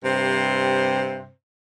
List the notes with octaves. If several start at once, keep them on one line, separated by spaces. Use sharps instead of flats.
G2 C3 C4 C5